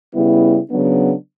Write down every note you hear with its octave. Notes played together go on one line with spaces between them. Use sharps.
C#3 G3 B3 E4
C#3 F#3 B3 D4